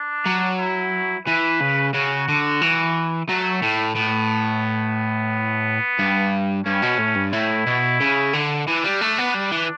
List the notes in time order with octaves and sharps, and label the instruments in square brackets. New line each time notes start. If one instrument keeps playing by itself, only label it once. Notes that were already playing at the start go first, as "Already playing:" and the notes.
Already playing: [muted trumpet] D4
[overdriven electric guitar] F#3
[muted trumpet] E4
[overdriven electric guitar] E3 [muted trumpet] B4
[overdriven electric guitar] C#3
[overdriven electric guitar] C#3 [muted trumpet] F#4
[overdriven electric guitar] D3
E3
[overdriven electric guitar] F#3 [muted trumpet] A3
[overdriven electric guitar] A2
[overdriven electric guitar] A2 [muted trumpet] B3
[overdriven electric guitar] G2
[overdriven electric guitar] G2 [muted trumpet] C#4
[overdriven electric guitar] B2
A2
G2
[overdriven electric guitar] A2 [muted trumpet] E4
[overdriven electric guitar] B2
C#3
D3
[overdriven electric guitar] E3 [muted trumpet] D4
[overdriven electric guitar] G3
A3
B3
G3
E3